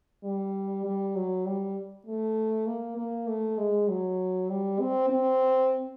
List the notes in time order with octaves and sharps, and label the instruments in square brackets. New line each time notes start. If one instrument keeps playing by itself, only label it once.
[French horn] G3
G3
F#3
G3
A3
A#3
A#3
A3
G#3
F#3
G3
C4
C4